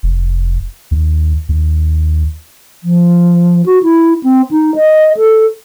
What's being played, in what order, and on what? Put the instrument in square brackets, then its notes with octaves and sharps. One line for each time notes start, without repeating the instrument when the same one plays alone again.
[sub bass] F1
D#2
D#2
[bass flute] F3
F#4
E4
C4
D#4
D#5
A4